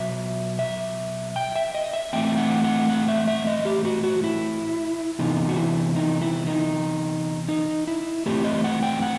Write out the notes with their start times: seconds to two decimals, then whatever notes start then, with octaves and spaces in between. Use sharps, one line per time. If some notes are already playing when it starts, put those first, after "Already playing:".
Already playing: B2 F#3 E5
0.59 E5
1.36 G5
1.56 E5
1.75 D#5
1.93 E5
2.13 A2 E3 A3 C4 G5
2.38 F#5
2.64 F#5
2.89 F#5
3.08 E5
3.28 E5
3.47 D#5
3.65 G4
3.85 F#4
4.04 F#4
4.24 E4
5.19 C3 E3 B3 D#4
5.49 F#4
5.57 E4
5.96 D#4
6.22 E4
6.47 D#4
7.49 D#4
7.87 E4
8.26 A2 E3 A3 C4 G4
8.44 D#5
8.64 F#5
8.83 G5
9.02 F#5